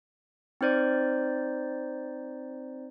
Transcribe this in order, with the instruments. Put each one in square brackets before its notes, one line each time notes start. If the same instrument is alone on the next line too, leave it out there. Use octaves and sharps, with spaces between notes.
[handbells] C4 D#4 C5 D5